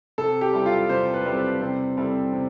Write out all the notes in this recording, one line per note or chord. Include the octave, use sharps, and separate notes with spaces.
C3 A4
G4
G3 C4 E4 A4
F4
C3 C5
B4
G3 C4 E4 A4
B4
C3 C5
G3 C4 E4 A4
C3